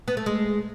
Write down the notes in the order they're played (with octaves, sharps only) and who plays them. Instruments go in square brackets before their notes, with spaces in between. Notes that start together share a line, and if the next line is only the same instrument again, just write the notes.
[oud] B3
A3
G#3